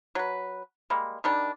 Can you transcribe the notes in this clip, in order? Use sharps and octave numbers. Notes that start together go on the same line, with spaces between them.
F#3 B4
G3 G#3 A#3
D#3 G3 D4